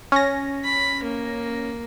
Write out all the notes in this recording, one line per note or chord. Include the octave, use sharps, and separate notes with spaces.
C#4 A#6
B5
A#3